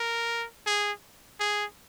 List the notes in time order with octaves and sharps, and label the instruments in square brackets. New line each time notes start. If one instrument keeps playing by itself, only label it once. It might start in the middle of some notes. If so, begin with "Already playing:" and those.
Already playing: [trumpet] A#4
G#4
G#4